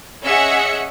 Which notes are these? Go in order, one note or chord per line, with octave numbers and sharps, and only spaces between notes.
C#4 G#4 D#5 E5 F#5 C#7